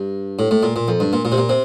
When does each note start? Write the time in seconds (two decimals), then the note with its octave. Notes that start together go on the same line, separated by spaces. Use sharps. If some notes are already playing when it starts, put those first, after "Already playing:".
Already playing: G2
0.39 A2
0.51 A2
0.63 A#2
0.76 A#2
0.88 F2
1.00 G2
1.13 A#2
1.25 A#2
1.32 C3
1.38 A#2
1.49 C3